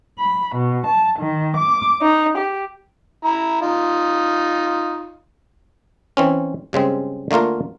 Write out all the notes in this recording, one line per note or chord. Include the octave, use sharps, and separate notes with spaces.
B5
B2
A5
D#3
D6
D#4
G4
E4 A#5
D#4 F4
E3 C4 C#4
G2 C#3 G#3 C4
D3 A3 A#3 F4 A#4